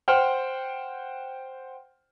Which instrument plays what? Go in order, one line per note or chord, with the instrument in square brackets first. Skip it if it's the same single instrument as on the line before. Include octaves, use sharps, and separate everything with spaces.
[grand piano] C5 F#5 G5 F6